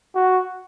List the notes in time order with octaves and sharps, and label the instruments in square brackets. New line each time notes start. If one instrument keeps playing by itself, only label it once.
[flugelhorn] F#4